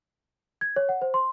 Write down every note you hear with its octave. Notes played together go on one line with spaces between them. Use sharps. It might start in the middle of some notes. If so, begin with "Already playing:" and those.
G#6
C#5
F#5
C5
C6